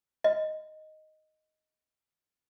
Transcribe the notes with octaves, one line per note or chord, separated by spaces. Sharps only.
D#5